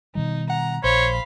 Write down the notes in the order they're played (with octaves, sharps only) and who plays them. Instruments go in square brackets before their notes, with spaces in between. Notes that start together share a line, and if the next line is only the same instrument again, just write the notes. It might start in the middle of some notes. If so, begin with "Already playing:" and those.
[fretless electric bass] B2 D#3 G3 [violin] D#4
[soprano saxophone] F#5 [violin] A#5
[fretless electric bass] A#1 [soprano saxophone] C5 [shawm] C#5 [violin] F5 B5